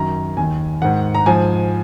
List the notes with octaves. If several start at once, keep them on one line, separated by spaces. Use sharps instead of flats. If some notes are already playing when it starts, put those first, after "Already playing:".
Already playing: F#2 D#3 A#5
D#2 D#3 G#5
G#2 D#3 F#5
A#5
G#2 F3 G#5